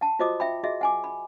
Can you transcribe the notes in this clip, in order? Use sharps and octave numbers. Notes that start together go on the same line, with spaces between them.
F#5 A5
F4 F#4 C5 D#5 D6 D#6
E5 G5 B5
F#4 G#4 D#5 E5
F#5 G#5 D6
B5